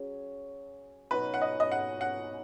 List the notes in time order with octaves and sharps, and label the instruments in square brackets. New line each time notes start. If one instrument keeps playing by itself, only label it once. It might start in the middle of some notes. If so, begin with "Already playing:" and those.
Already playing: [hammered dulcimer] F#3 C#4 G#4
[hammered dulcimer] B2 F#3 D#4 F#4 [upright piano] B4
[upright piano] F#5
D#5
D#5
F#5
F#5